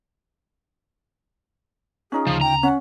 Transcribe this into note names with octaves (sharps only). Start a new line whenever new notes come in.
C#4 D#4 F4 G#4
D2 C#3 F3
G5 A#5
C#4 F#5